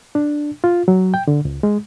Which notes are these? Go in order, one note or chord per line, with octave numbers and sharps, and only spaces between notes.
D4
F4
F#3
G5
D3
C#2
G#3